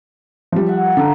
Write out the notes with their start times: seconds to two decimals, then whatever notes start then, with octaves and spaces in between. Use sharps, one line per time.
0.52 F3 G3
0.67 E5 F#5
0.83 A#4 F5
0.97 D3 G3 D#5 A#5